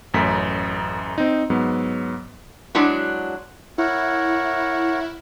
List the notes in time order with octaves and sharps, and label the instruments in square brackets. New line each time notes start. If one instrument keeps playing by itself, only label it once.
[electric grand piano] A1 F#2 A3 B6
C4 D#4
G#2 F#3 B3
[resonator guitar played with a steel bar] F#3 G#3 D4 E4 F#4
[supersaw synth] E4 [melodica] A#4 C#5 F#5